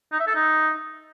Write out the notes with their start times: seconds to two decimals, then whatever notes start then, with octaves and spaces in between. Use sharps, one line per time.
0.12 D#4
0.20 E5
0.27 A4
0.35 D#4